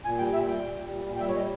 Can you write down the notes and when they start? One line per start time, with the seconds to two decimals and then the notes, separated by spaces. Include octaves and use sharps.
0.05 A#2 G#5
0.19 G3 G5
0.33 A#2 E5
0.48 G3 G5
0.62 A#2
0.78 G3
0.92 A#2
1.06 A#2
1.16 G5
1.20 G3 E5
1.29 C#5
1.35 G3 D#5